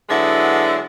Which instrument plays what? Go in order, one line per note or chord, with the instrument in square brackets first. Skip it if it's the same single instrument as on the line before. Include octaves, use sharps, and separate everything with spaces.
[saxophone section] D3 F#3 G#3 B3 E4